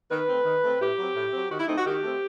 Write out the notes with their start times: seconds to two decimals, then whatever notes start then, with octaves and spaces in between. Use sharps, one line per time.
0.10 D#3 B4
0.28 A3 C4
0.45 D#3
0.63 A3 C4
0.80 A2 G4
0.98 F#3 C4
1.15 A2
1.32 F#3 C4
1.51 D#3 F#4
1.59 E4
1.67 A3 C4 D#4
1.77 F#4
1.85 D#3 G4
2.03 A3 C4